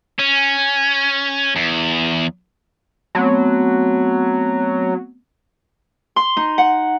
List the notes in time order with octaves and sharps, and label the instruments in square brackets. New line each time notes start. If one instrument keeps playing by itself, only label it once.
[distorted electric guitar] C#4
E2
[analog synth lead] F#3 [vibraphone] A3 B3 C4
[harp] C6
D#4
F#5